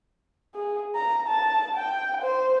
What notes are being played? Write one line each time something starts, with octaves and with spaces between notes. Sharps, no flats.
G#4
A#5
A5
G5
C5